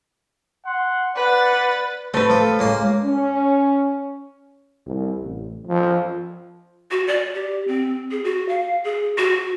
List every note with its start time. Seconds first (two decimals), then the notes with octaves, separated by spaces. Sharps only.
0.65 F#5 C6
1.16 B4 D5 F#5 A6
2.14 A3 C4 B4
2.30 F3 A4
2.59 C#2 A#3 C6
3.03 C#4
4.86 C2
5.22 A1
5.67 F3
6.91 F#4
7.07 D5
7.34 G4
7.67 C4
8.11 G#4
8.24 F#4
8.49 F5
8.84 G#4
9.18 F#4